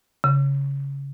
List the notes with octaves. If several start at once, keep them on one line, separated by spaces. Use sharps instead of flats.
C#3